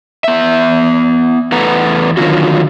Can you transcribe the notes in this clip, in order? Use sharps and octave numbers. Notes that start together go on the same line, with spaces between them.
B3 E5
E2 A3 B4 F#5 A#5
D3 D#3 F#3 F4 F#4